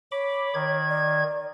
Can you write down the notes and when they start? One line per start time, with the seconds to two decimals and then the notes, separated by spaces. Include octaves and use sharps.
0.12 C#5 B5 D6
0.54 D#3 G#6
0.89 D5